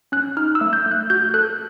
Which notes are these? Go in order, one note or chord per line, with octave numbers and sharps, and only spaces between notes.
C#4 F#6
D#4 F6
E6
A3
G6
A3
F#6
F#4 G6
A4 F#6